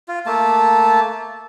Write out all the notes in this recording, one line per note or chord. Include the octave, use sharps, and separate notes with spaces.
F4
A3 A#3 A5